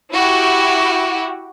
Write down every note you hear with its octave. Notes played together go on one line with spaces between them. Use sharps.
E4 F#4 G4